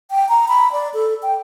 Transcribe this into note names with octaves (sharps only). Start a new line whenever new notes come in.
G5
A#5
B5
D5
A4
G5